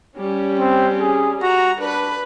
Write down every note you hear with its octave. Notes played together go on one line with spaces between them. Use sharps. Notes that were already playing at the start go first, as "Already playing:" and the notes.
G3 C#4
C4
G#4
F#4 A#5
D4 B4